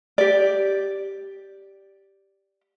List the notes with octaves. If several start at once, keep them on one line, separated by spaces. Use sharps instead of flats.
G4 D5